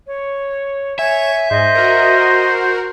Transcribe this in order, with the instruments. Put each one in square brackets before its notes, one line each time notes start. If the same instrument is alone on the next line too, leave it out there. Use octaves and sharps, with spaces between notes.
[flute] C#5
[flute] C#5 [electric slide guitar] E5 [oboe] G#5 [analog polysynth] E7
[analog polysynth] G#2 [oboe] C5 [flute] D#5
[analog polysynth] F#4 A#4